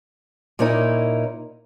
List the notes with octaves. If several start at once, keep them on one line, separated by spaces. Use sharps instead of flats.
A#2 A#3 C#4 D#4 E4 A#4